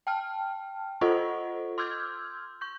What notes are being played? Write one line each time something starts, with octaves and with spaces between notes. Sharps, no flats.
G5 A5 F6
F4 A4 C5 D#5 F#5 C#6
C6 D6 E6 F6 G6 G#6
C#6 G6